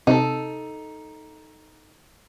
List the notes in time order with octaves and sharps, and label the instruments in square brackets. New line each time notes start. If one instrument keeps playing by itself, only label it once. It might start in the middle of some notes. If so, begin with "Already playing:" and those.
[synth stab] C3 [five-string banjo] D#4 A4